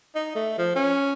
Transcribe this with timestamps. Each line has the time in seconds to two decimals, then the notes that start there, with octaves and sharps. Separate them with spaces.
0.15 D#4
0.35 A3
0.58 F3
0.75 C#4